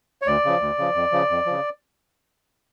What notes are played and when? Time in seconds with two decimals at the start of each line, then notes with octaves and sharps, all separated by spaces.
0.22 C#5
0.27 D2 D5
0.45 C#3 F3
0.61 D2
0.78 C#3 F3
0.95 F2
1.12 C#3 F3
1.30 F2
1.46 C#3 F3